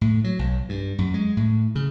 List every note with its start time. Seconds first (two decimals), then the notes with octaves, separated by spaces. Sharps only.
0.01 A2
0.24 F#3
0.39 B1
0.69 G2
0.98 F#2
1.14 G#3
1.37 A2
1.75 C#3